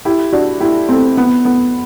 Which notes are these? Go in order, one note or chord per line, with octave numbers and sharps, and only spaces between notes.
E4 G4
D4 F#4
E4 G4
A3 C4
B3
B3